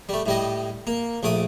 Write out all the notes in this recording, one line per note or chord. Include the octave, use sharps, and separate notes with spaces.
G3 A3
A2 G3 D#5
A#3
A#1 A3 D6 D#6